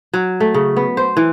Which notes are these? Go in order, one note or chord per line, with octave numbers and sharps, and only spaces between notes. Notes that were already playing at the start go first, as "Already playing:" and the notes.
F#3
A3
C#3
B3
C5
E3